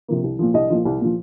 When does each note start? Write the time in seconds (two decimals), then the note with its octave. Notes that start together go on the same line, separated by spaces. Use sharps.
0.08 C3 F3 A#3
0.24 C2
0.39 A#2 F3
0.54 C2 D#5
0.70 A#2 F3
0.85 C2
1.01 A#2 F3